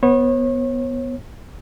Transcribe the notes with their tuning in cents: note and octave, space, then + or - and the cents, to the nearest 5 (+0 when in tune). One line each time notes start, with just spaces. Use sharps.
B3 -5 C#5 -35